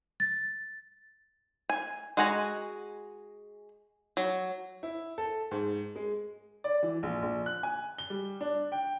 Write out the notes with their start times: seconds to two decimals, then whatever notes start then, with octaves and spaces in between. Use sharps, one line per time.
0.20 A6
1.70 G#5
2.17 G#3 F#4 F#5 G#5 A#5
4.17 F#3
4.83 E4
5.18 A4
5.51 G#2
5.96 G#3
6.64 D5
6.83 E3
7.03 A#1
7.22 A#1
7.46 F#6
7.63 G#5
7.98 G7
8.10 G3
8.41 D4
8.72 G5